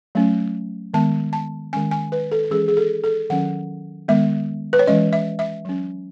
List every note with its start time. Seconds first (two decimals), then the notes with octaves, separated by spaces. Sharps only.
0.15 F#3 A3 C#4
0.94 D#3 G#3 B3 A5
1.33 A5
1.73 D#3 G#3 C#4 G#5
1.91 G#5
2.12 B4
2.32 A4
2.44 A4
2.51 E3 G#3 C#4 G#4
2.68 G#4
2.77 A4
3.04 A4
3.30 D#3 F#3 C#4 F#5
4.08 D#3 G#3 B3 E5
4.73 B4
4.79 C#5
4.87 E3 G#3 C#4 D#5
5.13 E5
5.39 E5
5.65 F#3 C#4